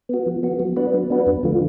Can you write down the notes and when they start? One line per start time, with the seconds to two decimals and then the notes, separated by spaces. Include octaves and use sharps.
0.09 B3 F#4
0.26 F3
0.43 B3 F#4
0.59 F#3
0.77 B3 D4 F#4 B4
0.94 F#3
1.10 B3 D4 F#4 B4
1.26 F2
1.43 D3 F3 A3 F4